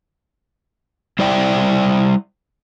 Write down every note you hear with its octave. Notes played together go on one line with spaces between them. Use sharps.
G3 E4 C5 D5 E5 G5